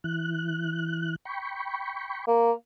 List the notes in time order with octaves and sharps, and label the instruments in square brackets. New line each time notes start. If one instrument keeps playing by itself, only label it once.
[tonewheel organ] E3 F#6
G5 B5 C#6
[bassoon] A#3